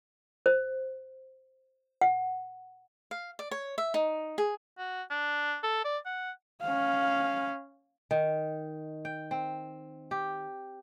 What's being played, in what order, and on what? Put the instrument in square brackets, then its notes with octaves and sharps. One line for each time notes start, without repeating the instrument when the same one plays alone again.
[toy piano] C5
F#5
[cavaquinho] F5
D5
C#5
E5
D#4
G#4
[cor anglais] F#4
D4
A4
D5
F#5
[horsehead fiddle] C#4 F5
[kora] D#3
G5
C4
G4